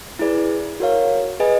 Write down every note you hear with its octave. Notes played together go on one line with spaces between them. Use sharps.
E4 G#4 B4 D5
F#4 A#4 C#5 F5
G#4 B4 D#5 G#5